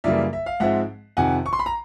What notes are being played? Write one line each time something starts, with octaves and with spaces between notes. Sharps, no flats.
F#2 C#3 E3 G3 A#3 D5 E5
E5
F5
G#2 F3 G#3 C4 E5 F#5
F2 C3 D#3 F#5 G#5
C#6
C6
B5
A#5